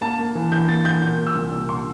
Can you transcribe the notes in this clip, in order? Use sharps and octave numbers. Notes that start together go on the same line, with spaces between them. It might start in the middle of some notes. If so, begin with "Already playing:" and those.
A#3 A5
A#3
E3
E3 G6
A#3 A6
E3 G6
A#2 G6
A#2
E6
C2
A#2
A#2 C6